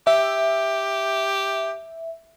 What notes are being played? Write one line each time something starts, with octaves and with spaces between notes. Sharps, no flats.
G4 E5